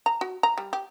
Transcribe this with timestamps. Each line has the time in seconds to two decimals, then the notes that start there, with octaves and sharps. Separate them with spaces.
0.06 A#5
0.21 F#4
0.43 A#5
0.58 G3
0.73 G4